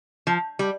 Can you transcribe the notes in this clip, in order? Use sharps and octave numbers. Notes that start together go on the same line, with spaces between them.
F3
G3